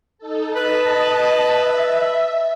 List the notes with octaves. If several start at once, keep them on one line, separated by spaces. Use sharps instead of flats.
D#4 A4
B4 D#5 A5
E5